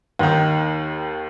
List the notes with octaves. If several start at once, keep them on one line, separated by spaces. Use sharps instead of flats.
D#2 D#3